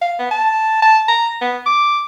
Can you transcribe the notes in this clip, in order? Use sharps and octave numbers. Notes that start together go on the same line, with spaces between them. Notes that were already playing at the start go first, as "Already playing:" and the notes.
F5
B3
A5
A5
A#5
B3
D6